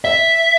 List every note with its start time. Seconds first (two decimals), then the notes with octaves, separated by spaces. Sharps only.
0.05 E5